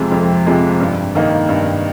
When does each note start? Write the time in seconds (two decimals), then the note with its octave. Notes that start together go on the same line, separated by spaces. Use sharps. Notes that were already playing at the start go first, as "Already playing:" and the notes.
Already playing: F2 C3 F3 G#3
0.12 F2
0.46 C3 F3 G#3
0.80 G2
1.15 D#3 A#3 D#4
1.49 G2